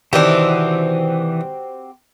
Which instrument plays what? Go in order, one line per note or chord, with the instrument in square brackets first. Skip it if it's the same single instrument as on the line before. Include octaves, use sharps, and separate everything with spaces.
[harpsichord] C3 D#3 D4 [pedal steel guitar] E3 [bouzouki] C4 F#4 G4